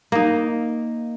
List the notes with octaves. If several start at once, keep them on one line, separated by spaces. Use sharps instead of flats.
A#3 D#4